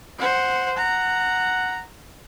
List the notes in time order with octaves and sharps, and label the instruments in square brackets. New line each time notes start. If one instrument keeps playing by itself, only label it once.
[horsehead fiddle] C5 F#5
[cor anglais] F#5 [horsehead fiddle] A#5